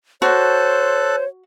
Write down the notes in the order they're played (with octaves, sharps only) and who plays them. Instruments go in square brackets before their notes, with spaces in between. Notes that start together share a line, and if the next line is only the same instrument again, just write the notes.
[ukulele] F#4 [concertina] A4 A5 F#6 [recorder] C5 [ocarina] C#5